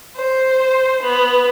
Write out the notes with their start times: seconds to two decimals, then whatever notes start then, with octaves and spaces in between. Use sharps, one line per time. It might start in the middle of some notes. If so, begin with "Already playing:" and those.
0.16 C5
1.03 B3